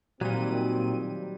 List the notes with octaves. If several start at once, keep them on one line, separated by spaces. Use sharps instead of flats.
A#2 D#3 F#3 G3 C4 F#4 D#7